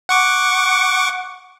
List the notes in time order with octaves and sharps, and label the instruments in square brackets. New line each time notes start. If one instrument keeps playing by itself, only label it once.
[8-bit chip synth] F#5 C#6 D6